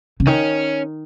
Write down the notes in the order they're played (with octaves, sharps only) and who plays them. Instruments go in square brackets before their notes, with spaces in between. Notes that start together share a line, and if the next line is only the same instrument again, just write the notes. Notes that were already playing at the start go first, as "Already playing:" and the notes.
[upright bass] C#3
[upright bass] D#3 [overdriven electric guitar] C#4